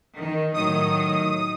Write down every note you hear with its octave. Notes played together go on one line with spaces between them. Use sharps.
D#3
A2 D#3 F#3 D#6